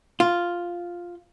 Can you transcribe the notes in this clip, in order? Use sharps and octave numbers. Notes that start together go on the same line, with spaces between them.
F4